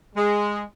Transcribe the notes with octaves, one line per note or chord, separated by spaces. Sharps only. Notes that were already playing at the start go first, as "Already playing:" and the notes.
G#3